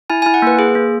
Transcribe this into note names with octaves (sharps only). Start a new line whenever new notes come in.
E4 G#5
G#5
E4
F#5
A#3 B4
G#4
A#3